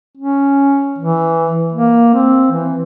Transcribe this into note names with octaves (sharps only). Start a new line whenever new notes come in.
C#4
E3
A#3
C4
E3